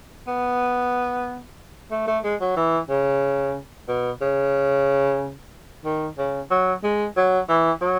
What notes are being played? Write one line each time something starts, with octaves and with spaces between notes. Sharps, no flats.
B3
A3
A3
G#3
F#3
E3
C#3
B2
C#3
D#3
C#3
F#3
G#3
F#3
E3
F#3